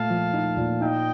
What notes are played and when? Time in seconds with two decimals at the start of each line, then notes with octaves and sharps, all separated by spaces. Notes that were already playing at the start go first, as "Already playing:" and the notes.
Already playing: A#2 A3 F5 A5
0.10 F3
0.33 D#4
0.57 A#2
0.81 D#4 D#5 G5